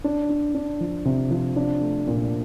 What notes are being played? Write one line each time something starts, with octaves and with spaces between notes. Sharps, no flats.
D4
D4
D4
F3
C3
F3
D4
A3
A#2